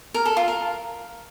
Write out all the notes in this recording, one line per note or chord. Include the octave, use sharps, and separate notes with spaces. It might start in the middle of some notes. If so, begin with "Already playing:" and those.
A#4
A4
F4
A#4